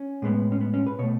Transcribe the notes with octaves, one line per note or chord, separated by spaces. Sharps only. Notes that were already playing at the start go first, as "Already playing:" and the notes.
Already playing: C#4
A2 G#3 B3
C#4
B3
C#4
B4
B2 A3 C#5